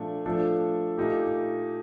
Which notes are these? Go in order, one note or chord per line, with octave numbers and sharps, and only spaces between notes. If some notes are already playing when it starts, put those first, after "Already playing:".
Already playing: A#2 F3 A3 D4
F3 A3 D4 A4
A#2 A3 D#4 G4